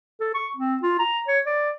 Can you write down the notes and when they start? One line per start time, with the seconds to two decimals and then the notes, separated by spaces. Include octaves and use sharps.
0.20 A4
0.34 C#6
0.57 C4
0.83 F4
0.99 A#5
1.28 C#5
1.46 D5